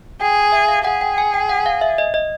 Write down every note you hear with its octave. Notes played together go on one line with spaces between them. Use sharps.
G#4 G5
E5
F5
G#4 F#5
G5
G#5
G5
F#5
F5
E5
D#5
D#5